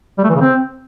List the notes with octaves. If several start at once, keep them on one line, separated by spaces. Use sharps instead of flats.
G3
A3
E3
C#3
C4